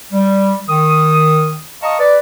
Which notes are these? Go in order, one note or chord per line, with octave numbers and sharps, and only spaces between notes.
G3
D#3 D#6
D#5 F5 A5 A#5 C#6 D#6
B4 D5